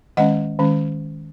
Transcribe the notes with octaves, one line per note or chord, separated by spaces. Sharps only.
D#3 G#3 C#4 D#5 F#5
D#3 G#3 C#4